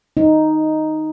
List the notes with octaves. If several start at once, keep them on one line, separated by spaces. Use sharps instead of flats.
D#4